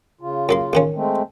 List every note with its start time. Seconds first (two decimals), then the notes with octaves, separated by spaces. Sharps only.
0.21 C#3 F4
0.49 F#2 A#3 C6
0.73 A1 D#3 C#4
0.95 G#3 A3 C4